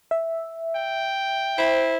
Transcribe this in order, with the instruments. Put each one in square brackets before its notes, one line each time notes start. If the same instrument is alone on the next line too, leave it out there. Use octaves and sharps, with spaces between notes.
[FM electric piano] E5
[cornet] G5
[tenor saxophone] E4 [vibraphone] C5